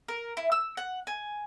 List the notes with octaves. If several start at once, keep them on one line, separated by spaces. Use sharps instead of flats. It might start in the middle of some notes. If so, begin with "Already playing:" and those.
A#4
E4
E6
F#5
G#5